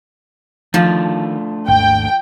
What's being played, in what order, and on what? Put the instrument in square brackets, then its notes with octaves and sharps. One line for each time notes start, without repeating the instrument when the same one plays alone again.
[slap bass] D#3 [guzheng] F3 [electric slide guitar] A3 D4 F4
[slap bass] G#1 D#2 G#2 [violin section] G5